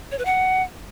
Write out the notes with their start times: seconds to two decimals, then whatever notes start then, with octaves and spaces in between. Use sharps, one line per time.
0.11 C#5
0.18 B4
0.25 F#5